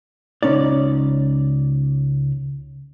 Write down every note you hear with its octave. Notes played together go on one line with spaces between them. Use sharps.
C#2 C#4 D#4 D5